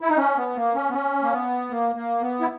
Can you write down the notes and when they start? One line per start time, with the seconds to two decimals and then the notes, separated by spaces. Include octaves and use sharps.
0.01 E4
0.10 D#4
0.18 C#4
0.37 B3
0.56 A#3
0.75 C#4
0.89 B3
0.94 C#4
1.23 A#3
1.32 B3
1.70 A#3
1.96 A#3
2.21 B3
2.41 E4